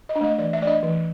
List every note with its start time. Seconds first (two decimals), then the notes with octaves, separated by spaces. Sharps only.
0.09 D#5
0.15 D4
0.21 A3 D#5
0.38 E3 D5
0.53 E5
0.60 A3 D5
0.65 D4 D#5
0.82 E3